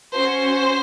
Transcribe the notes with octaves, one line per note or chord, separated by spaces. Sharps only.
C#4 F#4 C5